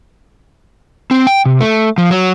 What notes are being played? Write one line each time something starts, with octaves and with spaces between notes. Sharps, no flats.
C4
G5
C3
A3
F3
F#3